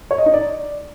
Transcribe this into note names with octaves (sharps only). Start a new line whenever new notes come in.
C#5
D#5
D#4
D5